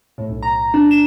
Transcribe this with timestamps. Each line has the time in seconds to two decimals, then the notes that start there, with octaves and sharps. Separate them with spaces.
0.18 A2
0.30 B1
0.43 A#5
0.74 D4
0.91 E7